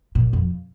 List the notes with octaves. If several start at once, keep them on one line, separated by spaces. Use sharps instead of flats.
A#2
F2